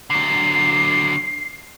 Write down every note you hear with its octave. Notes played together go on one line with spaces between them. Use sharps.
D3 F#3 C7